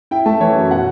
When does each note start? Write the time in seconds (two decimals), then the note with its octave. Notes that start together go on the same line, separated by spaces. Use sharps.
0.11 E4 G5
0.26 A3 A5
0.40 E3 C#5
0.56 F#2
0.71 B2 F#5